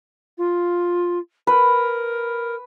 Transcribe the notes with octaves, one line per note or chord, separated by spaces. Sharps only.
F4
A#4 B4